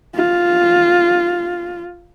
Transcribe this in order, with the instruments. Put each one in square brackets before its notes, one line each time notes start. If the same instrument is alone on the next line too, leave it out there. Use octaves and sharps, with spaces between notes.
[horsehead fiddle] F4